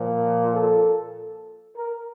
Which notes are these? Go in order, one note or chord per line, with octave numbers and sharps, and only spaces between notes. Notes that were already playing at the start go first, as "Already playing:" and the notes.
Already playing: A#2 F3
A4
A#4